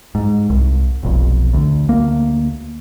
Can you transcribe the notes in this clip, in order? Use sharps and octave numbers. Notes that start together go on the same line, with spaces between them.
G#2
C2
F1 B1 F2
D2
D2 A#3